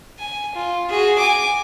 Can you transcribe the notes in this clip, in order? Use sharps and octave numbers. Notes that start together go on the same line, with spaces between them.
G#5
F4
F#4 G#4
G#5 D6